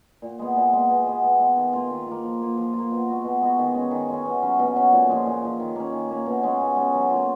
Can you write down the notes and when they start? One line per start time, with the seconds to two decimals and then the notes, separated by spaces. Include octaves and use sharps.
0.22 A#2
0.39 G#3 B3
0.56 A#2
0.73 G#3 B3
0.90 B2
1.06 G#3 B3
1.24 B2
1.40 G#3 B3
1.57 D#3
1.73 A#3 F4
1.91 D#3
2.07 A#3 F4
2.24 F3
2.41 A#3 F4
2.57 F3
2.74 A#3 F4
2.91 B2
3.08 G#3 B3 F#4
3.24 B2
3.41 G#3 B3 F#4
3.59 D#3
3.75 G#3 C#4
3.91 D#3
4.09 G#3 C#4
4.25 B2
4.42 F#3 C#4
4.59 B2
4.76 F#3 C#4
4.92 A#2
5.09 F3 G#3
5.26 A#2
5.42 F3 G#3
5.60 D#3
5.76 A#3 C#4
5.92 D#3
6.09 A#3 C#4
6.26 B2
6.43 G#3 C#4
6.60 B2
6.76 G#3 C#4
6.94 F#3
7.10 A#3 F4